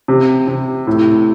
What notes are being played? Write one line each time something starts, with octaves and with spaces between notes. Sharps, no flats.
C3
C3
A2